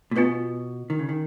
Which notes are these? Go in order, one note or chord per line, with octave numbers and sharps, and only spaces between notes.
A#2
B2 B3 F4 B4
D#3
C#3
D#3